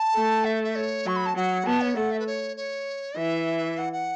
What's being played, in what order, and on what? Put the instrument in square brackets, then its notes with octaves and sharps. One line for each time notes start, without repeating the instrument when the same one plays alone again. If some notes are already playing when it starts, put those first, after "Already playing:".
Already playing: [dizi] A5
[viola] A3
[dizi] E5
E5
C#5
[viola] F#3 [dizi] C#6
[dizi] B5
A5
[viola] F#3 [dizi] F#5
[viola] B3 [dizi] A5
[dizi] C#5
[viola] A3 [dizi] F#5
[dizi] E5
B4
C#5
C#5
[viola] E3 [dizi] E5
[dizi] F#5
F#5